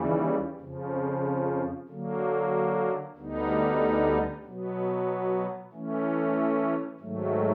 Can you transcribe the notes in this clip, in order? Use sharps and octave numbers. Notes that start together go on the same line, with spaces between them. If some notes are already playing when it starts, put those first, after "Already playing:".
Already playing: D#2 C#3 E3 G3
F2 C#3 F3
D3 F#3 A#3
D2 D3 G3 B3 D#4
B2 F#3 B3
E3 A3 C#4
G#2 D#3 F#3 A3